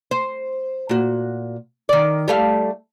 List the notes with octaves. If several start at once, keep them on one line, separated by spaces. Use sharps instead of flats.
C5
A#2 F#4
D#3 D5
G3 A3 F5